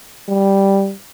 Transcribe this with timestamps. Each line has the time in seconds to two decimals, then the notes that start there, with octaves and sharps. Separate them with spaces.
0.28 G3